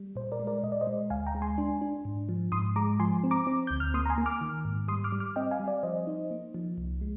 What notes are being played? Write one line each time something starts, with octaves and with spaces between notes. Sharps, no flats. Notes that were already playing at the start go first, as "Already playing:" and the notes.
Already playing: G3
A#2 C5
A#4 D5
G#3
A#4 D5
A#2 D#5
D5
C5 D#5
G#3
D2 F5 G#5
G5 A#5
G#3
G#5 C6
D4
D4
G#2
F3
G#2 C6 D#6
G#3 A#5 D6
F3 G#5 C6
C4
A#5 D6
C4
D2 G6
F6
A#3 C6 D#6
A#5
G#5 C6
A#3
D6 F6
D#3
G#2
G3 C6 D#6
D6 F6
G3
D6 F6
C4 D#5 G5
F5 G#5
G3
D5 F5
F3 C5 D#5
D#4
A#3
F3
C2
G#3